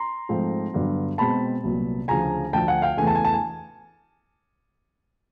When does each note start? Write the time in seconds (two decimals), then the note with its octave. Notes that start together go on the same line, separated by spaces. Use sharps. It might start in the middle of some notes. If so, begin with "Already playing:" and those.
Already playing: A#5 C6
0.29 G#2 F3 A3 C4
0.74 G2 D3 F#3 B3
1.18 B2 G#3 C4 A5 B5
1.63 C2 A#2 F#3 B3
2.08 D2 C#3 F3 G#5 A#5
2.52 D2 D3 F3 G5 A5
2.68 F#5 G#5
2.82 F5 G5
2.97 E2 C#3 E3 A3 G#5
3.07 A5
3.15 G#5
3.25 A5
3.34 G#5